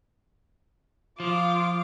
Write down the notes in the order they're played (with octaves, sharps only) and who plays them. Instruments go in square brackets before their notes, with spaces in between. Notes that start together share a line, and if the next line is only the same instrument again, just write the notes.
[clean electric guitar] F3 [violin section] F4 [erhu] D6